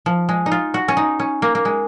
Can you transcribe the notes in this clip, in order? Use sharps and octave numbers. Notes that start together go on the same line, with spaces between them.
F3
G#3
D#4
F4
F#4
C#4
D#4
C#4
A#3
A#3
G#3